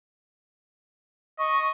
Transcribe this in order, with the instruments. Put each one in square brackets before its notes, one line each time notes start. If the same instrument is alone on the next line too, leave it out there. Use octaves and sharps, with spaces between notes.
[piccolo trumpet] D#5 [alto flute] C#6